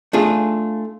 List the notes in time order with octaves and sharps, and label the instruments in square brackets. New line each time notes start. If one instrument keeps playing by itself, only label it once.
[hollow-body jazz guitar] A3 D4 F4 G#4